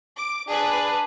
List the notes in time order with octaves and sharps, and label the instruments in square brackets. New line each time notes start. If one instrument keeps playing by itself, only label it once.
[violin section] D6
[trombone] D4 [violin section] G#4 B4